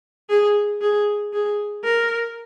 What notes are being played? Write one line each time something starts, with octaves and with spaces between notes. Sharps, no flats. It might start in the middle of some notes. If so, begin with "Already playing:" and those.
G#4
G#4
G#4
A#4